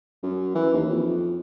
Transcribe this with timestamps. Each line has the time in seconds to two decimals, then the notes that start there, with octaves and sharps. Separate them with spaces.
0.23 F#2
0.55 E3
0.74 D#2
0.91 F2